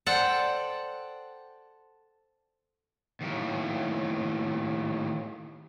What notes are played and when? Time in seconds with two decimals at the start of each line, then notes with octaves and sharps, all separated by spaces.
0.06 A4 C5 D5 F#5 G5
3.21 D#2 A2